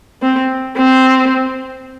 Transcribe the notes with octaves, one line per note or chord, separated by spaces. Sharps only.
C4
C4